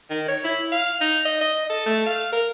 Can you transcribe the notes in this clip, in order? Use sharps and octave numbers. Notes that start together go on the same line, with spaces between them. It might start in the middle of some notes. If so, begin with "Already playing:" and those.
D#3
C#5
E4
F5
D#4
D#5
D#5
A4
A3
F5
A#4